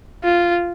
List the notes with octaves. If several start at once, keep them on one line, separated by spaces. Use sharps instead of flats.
F4